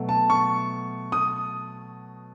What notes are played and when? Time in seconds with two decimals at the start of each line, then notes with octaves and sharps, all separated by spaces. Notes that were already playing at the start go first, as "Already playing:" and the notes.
Already playing: B2 F#3 A3
0.09 A5
0.30 C#6
1.12 D#6